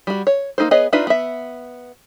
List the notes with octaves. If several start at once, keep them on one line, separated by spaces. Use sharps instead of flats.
G3 F#4
C#5
A#3 B3 D#4 A4 C5
B3 G#4 B4 C#5 D#5
D4 D#4 F4 B4 E5
B3 E5